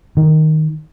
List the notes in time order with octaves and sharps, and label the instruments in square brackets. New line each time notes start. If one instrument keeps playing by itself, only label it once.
[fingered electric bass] D#3